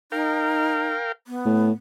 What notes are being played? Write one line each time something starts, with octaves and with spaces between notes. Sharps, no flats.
D#4 A#4 F5 G5
B3
A2